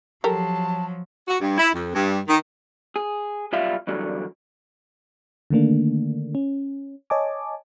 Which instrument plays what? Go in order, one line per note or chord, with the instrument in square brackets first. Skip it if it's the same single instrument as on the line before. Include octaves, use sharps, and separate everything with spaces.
[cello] F3 F#3 [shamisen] G4 A4 A#4 [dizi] A5
[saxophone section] F#4
G2
E4
F2
G2
D#3
[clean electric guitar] G#4
B1 G3 F4 E5 F5
E2 G2 D3 F#3
[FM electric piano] D3 D#3 A3 A#3 D4
C#4
C#5 D#5 G#5 A5 D6